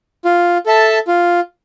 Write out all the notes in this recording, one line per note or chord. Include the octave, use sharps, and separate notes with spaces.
F4
A4 E5 A5
F4